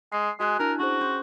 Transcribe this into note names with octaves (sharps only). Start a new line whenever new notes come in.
G#3 C7
G#3 F#4 G#5 F#6
D4 E4 A#4 A5
C#4 F#4 G#4 C5
C#4 C6 G6